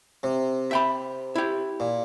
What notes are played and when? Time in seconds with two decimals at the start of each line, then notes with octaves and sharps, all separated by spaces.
0.23 C3
0.71 E5 G5 B5
1.35 E4 G4
1.80 A#2